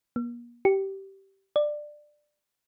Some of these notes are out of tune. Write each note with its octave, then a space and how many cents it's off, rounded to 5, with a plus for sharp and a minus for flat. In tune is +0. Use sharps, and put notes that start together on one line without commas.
A#3 +40
G4 -15
D5 +15